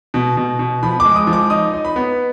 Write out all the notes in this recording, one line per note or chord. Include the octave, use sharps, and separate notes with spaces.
B2
B2
B2
F3 B5
D6
G#3
D#6
F3
D6
D#4 D#6
D#4
B5
B3